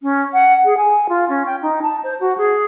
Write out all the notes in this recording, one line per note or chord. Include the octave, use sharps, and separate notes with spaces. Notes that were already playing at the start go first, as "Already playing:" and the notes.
C#4
F#5
G#4
G#5
F4
C#4
G5
D#4
A5
C5
F#4
G#4